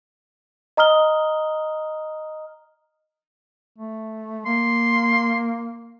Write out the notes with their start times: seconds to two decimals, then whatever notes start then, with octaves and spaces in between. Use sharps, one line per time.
0.77 D#5 A#5 D#6 F6 G7
3.79 A3
4.46 A#3 C6